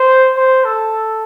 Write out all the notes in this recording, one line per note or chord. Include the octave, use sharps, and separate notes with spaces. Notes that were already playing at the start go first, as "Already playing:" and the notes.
Already playing: C5
C5
A4